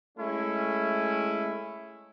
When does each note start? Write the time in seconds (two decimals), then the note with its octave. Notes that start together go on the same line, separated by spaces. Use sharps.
0.18 G#3 A3 C#4 E4